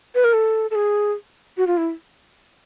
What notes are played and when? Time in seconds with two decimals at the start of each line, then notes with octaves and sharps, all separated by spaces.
0.15 B4
0.24 A#4
0.33 A4
0.71 A4
0.75 G#4
1.57 F#4
1.67 F4
1.77 E4